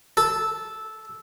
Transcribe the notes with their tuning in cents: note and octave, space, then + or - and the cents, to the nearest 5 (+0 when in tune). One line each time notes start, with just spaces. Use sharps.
A4 -10